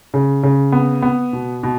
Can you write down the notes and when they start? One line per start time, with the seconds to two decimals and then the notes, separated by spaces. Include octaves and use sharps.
0.14 C#3
0.43 C#3
0.72 B3
1.02 B3
1.33 B2
1.63 B2